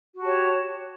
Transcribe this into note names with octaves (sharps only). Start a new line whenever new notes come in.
F#4 G4 C#5 A5